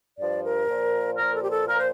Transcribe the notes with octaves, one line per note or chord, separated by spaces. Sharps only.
G2 F3 D5
A#4
A#2 F3
A#2 F3 A#4
A4
G4
A4
A#2 F3 A#4
C5